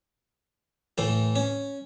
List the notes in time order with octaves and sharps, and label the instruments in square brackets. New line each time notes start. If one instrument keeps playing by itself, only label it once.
[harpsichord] A2 E3 A3
C#4